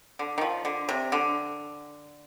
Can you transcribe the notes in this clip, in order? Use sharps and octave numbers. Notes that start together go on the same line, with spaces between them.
D3
D#3
F3
D3
C3
D3